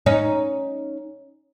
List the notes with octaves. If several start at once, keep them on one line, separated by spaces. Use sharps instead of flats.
C#4 D#4